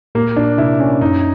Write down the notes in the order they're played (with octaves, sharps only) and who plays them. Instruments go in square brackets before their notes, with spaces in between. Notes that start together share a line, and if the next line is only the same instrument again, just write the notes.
[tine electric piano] A#2 [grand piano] A#3
[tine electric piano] A#2 [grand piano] D4
[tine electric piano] C3 [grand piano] E4
[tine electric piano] C#4
[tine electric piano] F#2 [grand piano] D#4